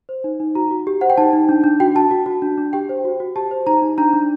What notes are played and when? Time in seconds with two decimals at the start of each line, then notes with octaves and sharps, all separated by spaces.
0.09 C5
0.24 D#4
0.40 D#4
0.55 F#4 A#5
0.71 F#4
0.87 G4
1.01 C5 F#5
1.10 G5
1.17 D#4 A5
1.33 D#4
1.49 D4
1.64 D4
1.80 F#4 G5
1.95 F#4 A5
2.11 F#4
2.26 F#4
2.42 D4
2.58 D4
2.73 G4 G5
2.89 C5
3.05 F#4
3.20 F#4
3.36 G4 A5
3.51 C5
3.67 D#4 A#5
3.82 D#4
3.98 D4 A#5
4.13 D4